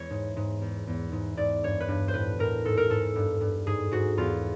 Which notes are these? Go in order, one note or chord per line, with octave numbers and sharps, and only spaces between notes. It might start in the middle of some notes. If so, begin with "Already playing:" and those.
Already playing: E2 G#3 C#5
G#2
G#2
E2
E2
G#2
G#2 D5
G2 C#5
B4
G2
C5
A2 B4
A2 A#4
G#2 A4
A#4
G#2 A4
G2
G2
G#2 G#4
G#2 F#4
E2 F4